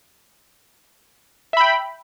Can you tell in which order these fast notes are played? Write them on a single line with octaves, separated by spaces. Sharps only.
E5 B5 G5